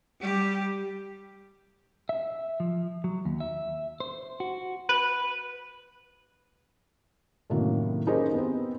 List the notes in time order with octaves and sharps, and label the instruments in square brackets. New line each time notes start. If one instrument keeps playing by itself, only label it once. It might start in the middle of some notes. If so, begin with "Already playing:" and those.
[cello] G3 G4
[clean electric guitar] E5
F3
F#3
D#2
E5
C5
F#4
[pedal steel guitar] B4
[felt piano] F#2 A2 C3 D#3 F#3 A#3
C#4 D#4 G4 G#4 A#4 C5
B3 C4